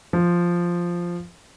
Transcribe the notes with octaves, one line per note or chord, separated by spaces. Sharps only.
F3